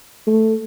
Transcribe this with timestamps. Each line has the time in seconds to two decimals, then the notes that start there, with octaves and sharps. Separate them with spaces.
0.27 A3